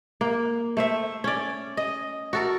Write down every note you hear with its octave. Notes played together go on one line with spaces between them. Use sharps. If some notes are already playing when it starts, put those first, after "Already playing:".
A#3
A3 C5 E5
C#4 D5
D#5
F#4 A4 A#4